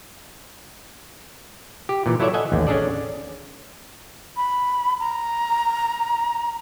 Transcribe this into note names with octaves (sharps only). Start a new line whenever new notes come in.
G4
A#2 E3
F#3 E4 A4 C#5 D5 E5
A4 D#5 E5 F#5 G#5
A1 D#2
C#4 D4 G#4 A4 D5
B5
A#5